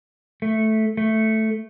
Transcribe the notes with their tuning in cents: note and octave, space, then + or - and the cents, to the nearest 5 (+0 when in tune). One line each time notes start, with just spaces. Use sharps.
A3 -5
A3 +0